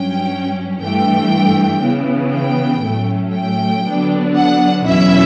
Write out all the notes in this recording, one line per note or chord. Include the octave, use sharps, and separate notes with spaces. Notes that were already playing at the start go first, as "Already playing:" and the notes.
Already playing: G2 F#3 C#4 G5
G2 E3 A3 G5
C#3 E3 B3
G5
A2 F#3 A3 C#4
G5
D3 F#3 B3 D4
F#5
E2 B2 F#3 C#4 E4 E5